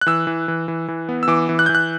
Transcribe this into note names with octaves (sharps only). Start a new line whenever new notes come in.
F#6
E3 E6
E3
E3
E3
E3
B3
E6
E3 D6
E3
F#6
E3 G6
F#6